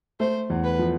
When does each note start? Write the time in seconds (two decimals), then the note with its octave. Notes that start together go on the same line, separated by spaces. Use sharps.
0.20 A3 C5
0.50 E2
0.64 B4
0.79 F3